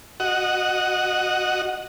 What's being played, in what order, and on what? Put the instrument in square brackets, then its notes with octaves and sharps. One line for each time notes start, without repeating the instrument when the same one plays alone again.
[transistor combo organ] F#4 D#5 F#5